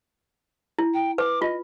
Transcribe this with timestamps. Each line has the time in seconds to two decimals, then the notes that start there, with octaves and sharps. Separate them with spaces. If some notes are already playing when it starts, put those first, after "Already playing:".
0.79 E4
0.93 G5
1.18 B4 D6
1.42 F4 D#5